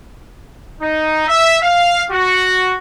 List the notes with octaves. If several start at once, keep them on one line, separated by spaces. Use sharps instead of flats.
D#4
E5
F5
F#4